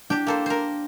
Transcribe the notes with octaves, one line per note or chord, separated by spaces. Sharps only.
D4 G4 G5
A#3 A4 C5
A#4 C5